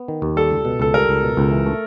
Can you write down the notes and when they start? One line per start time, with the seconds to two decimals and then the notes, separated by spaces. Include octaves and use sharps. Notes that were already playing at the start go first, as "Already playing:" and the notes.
Already playing: B3
0.08 D#3
0.22 D#2
0.36 G3 A4
0.51 C#2
0.65 B2
0.80 C#2 A4
0.94 G3 A#4
1.09 C#2
1.23 B2
1.37 C#2
1.51 E3
1.66 A3